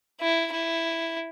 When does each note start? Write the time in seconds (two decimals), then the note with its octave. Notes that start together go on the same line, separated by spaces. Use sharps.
0.20 E4
0.52 E4